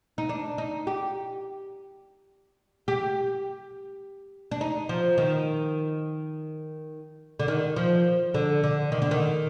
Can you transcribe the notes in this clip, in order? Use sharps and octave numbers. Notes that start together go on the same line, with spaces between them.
D#4
D4
D#4
G4
G4
D4
D#4
F3
D#3
D3
D#3
F3
D3
D3
D#3
D3
D#3